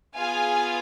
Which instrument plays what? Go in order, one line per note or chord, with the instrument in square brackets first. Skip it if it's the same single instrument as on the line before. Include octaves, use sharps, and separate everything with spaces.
[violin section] B3 F4 G#4 F5 G#5